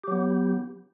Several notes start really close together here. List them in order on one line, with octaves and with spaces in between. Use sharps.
G4 F#3 B3